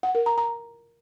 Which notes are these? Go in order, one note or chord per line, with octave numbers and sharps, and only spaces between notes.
F#5
A#4
A#5
A#5